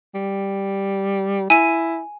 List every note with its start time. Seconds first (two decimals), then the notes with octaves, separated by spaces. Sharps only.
0.15 G3
1.50 E4 G#5 D#7